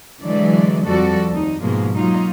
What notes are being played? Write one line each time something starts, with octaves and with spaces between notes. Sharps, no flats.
D3 E3 F#3 G#3 D5
F2 F3 G3 F#4 A4 D5
D#2 D#4
G#2 B2 F3 G#3 A#3
F#3 A#3 D#4 F4